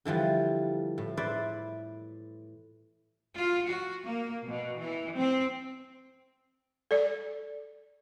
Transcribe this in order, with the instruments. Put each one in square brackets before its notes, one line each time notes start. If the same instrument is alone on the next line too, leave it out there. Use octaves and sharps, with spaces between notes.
[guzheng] D3 E3 F3 G3
A2
E4 B4 C5 D5 E5
[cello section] F4
F#4
A#3
B2
E3
C4
[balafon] A4 D5